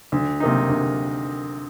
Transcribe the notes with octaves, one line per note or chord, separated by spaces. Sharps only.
D2
C3 D#3 A#3 D#4
D2